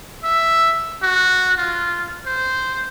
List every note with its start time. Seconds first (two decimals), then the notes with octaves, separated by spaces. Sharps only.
0.24 E5
1.03 F#4
1.58 F4
2.26 C5